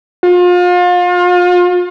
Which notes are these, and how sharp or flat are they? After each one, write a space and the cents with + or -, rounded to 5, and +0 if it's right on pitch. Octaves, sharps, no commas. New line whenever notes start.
F4 +35